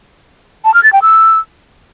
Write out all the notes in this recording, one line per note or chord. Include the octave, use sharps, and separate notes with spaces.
A5
F6
A6
G5
E6